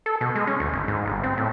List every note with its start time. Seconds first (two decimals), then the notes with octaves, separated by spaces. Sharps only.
0.06 A4
0.21 B2
0.35 G#3
0.47 C#4
0.60 D2
0.73 G#1
0.88 G#2
1.06 G1
1.23 C4
1.37 A2